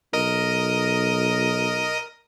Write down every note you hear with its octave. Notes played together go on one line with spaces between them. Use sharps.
B1 A#4 D#5 D#6